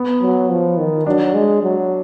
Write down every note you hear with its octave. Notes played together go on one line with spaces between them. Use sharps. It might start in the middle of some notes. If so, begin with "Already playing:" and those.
Already playing: B3
F#3
F3
D#3
F#3 D4
G#3
F#3